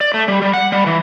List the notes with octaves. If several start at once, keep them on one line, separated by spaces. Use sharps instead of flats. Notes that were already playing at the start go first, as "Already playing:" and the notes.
D5
A3
G3
G3
F#5
G3
E3